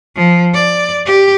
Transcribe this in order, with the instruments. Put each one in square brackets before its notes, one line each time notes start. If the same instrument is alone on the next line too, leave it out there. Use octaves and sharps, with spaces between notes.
[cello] F3
D5
G4